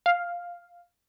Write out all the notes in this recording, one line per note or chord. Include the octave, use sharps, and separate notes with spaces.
F5